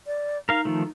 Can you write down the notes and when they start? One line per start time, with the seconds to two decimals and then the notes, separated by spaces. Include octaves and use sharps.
0.07 D5
0.49 D#4 A#4 F5
0.65 D#3 F3 A3